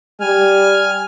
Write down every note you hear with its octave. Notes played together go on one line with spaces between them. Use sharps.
G3 G#5 F6